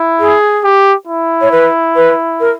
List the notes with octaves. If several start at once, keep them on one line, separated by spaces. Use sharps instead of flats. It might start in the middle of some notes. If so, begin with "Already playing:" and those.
Already playing: E4
G#4
G4
E4
C#5
B4
B4
A#4